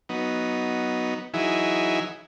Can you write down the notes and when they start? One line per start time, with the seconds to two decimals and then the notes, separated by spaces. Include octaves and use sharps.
0.09 F#3 B3 D#4
1.34 E3 F#3 D#4 E4 G#4